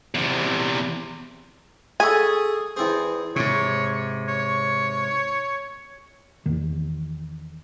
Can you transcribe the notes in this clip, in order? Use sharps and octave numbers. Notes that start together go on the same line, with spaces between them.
E2 C3
G#4 A4 C#5 G#5 B5
E2 C4 G#4 C5
G#2 C3 C#5
C#5
E2 D#3